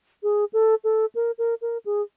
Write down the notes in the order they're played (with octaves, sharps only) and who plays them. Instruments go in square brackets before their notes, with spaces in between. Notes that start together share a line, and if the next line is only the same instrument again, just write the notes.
[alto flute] G#4
A4
A4
A#4
A#4
A#4
G#4